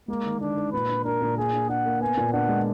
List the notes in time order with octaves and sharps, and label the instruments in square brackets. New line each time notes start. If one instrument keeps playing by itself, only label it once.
[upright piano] G#3 [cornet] A#3
[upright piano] D#3
[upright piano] D#3 [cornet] D4
[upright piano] D#3
[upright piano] A#2 [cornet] B4
[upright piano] D4
[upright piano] D4 [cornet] A#4
[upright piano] A#2
[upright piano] A#3 [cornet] G#4
[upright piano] D4
[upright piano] D4 [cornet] F#5
[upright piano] A#3
[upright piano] B3 [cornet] G#5
[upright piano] A#2
[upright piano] D4 [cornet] F#5
[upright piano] G#3